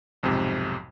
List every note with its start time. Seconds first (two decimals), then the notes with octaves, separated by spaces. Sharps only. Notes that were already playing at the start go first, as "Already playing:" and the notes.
0.23 B1 F2 G#2 C3